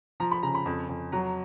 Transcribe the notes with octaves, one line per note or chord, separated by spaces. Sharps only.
F3 A#5
B5
C#3 A#5
B5
F2
F2
F#3 A#5